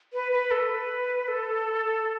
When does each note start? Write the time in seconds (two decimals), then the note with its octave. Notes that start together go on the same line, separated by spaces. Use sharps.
0.13 B4
0.32 B4
0.51 A4
0.70 B4
1.28 A4